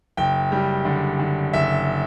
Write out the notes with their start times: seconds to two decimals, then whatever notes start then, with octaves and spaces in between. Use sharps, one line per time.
0.17 F#1 G5
0.52 G3
0.85 D3
1.19 D3
1.53 F#1 E5